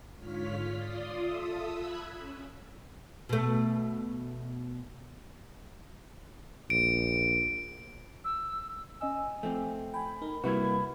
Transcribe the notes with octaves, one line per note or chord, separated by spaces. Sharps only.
G#2 D3 F4 C#5 F6 B6
F4 D5 C6 D#6
F4 A4 E5 D#6 E6
B5 E6 F#6 G#6
C#4
B2 A3
A#1 D7
E6
C#4 D#5 G#5 E6
F3 A3 C4
G5 G#5 B5
D#4 A#4
C3 G3 A#3 E4 F#4 B4 B5 G#6